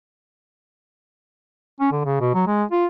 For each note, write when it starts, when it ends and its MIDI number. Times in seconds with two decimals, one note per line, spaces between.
1.80 1.91 61
1.92 2.02 50
2.05 2.20 49
2.21 2.31 47
2.35 2.42 54
2.47 2.64 56
2.71 2.86 65